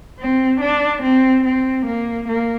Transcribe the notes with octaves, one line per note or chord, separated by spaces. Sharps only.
C4
D4
C4
C4
A#3
A#3